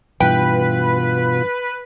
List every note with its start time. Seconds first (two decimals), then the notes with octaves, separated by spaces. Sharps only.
0.20 G2 B2 E3 F4 B4 G5